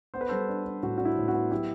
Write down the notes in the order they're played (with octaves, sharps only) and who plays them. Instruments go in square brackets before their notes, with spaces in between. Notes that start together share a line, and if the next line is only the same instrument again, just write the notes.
[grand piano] B3 C5
B4
G3 A4 C5
D4
D4
A2 F#4
D4 F#4
E4
A2
F#4
B3
F#3 E4 G4